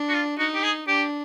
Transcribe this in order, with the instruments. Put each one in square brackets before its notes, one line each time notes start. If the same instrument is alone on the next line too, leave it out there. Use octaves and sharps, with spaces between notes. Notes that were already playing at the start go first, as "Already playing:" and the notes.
Already playing: [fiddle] D4
[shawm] F#4
F4
[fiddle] D#4 [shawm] F#4
[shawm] G4
G#4
[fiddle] D4 [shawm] G4